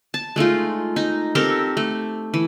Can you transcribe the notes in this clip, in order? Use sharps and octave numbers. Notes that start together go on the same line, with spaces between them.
A5
G#3 A3 D#4 F4
D#4
C4 G4 A4 A#4
A3
E3